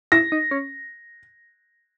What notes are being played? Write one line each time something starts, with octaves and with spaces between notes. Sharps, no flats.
E4 A#6
D#4
C#4